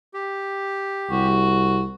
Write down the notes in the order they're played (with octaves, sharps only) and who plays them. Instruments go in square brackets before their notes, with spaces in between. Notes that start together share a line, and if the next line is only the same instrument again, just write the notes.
[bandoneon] G4
[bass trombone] C2 [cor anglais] F#4